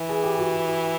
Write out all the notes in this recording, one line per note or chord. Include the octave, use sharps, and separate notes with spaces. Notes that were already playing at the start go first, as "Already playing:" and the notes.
Already playing: E3
G#4
G4
F#4